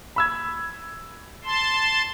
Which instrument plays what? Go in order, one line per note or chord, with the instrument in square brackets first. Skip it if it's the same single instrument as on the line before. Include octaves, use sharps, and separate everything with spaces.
[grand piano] B5 E6 G#6
[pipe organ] A5 C6